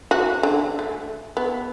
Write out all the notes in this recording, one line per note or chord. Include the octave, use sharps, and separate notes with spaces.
F#4
D3
A3
B3